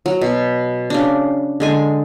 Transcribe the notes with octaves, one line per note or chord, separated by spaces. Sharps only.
F#3
B2
C#3 D4
D3 G#3 G#5